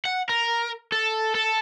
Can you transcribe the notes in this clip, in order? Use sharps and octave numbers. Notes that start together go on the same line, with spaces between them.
F#5
A#4
A4
A4